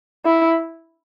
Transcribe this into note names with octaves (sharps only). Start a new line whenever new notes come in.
E4